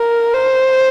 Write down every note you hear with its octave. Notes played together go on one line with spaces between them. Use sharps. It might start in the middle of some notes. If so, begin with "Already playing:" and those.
Already playing: A#4
C5